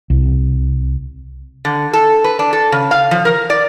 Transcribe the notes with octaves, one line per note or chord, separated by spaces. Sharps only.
C2
D3
A4
B4
D4
A4
C#3
F5
F3
A#4
D5